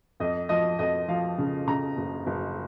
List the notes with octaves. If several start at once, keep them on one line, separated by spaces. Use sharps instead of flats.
F2 D#5
F3 D#5
F2 D#5
F3 F5
C#3
C#3 A#5
F#1
F#1